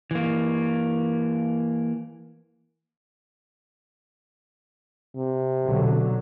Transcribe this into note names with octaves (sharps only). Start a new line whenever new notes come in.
E3 A#3
C3
B1 D3 F#3